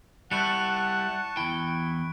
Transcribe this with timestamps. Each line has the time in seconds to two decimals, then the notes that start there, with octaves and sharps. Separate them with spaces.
0.31 G3 E4 F#5 A5 C#6 F#6 C#7
1.37 E2 E4 G5 D7